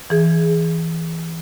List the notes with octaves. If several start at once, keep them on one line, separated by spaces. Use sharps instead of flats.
E3 G#4